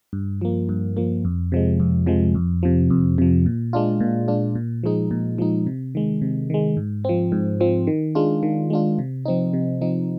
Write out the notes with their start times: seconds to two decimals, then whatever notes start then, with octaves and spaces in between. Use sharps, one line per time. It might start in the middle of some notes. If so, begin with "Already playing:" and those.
0.13 G2
0.41 F3 A#3
0.69 G2
0.97 F3 A#3
1.25 F2
1.52 C3 F3 G#3
1.80 F2
2.06 C3 F3 G#3
2.35 F2
2.63 C3 F3
2.91 F2
3.18 C3 F3
3.46 A#2
3.73 G#3 D4 F4
4.00 A#2
4.28 G#3 D4 F4
4.55 A#2
4.83 F3 G#3 D#4
5.11 A#2
5.38 F3 G#3 D#4
5.67 C3
5.95 D#3 G#3
6.22 C3
6.50 D#3 G#3
6.77 G#2
7.05 F3 C4
7.32 G#2
7.61 F3 C4
7.87 D#3
8.15 G#3 D4 F4
8.43 D#3
8.70 G#3 D4 F4
8.99 C3
9.25 F3 C4 D#4
9.53 C3
9.81 F3 C4 D#4